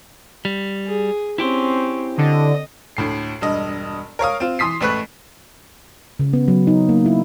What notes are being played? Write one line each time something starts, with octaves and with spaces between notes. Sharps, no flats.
G3
G#4
C4 C#4 E4 G4 C5
D3 D#5
D2 A2 C7
E1 G2 D#5
A#4 C#5 F5 D#6
C4 F4
E3 C6 D#6 B6 C7
A1 A3 B4 C#6 F#6
C#3
B3
F#3
D#4
A#3
E4